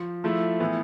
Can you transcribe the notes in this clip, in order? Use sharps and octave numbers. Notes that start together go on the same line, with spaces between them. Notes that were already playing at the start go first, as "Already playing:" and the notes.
Already playing: F3
F3 A3 E4
A2 E3 B3